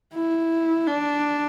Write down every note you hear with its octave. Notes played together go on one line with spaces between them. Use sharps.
E4
D4